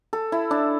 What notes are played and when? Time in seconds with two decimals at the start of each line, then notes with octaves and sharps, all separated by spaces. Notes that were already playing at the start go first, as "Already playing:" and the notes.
0.13 A4
0.32 E4
0.51 D4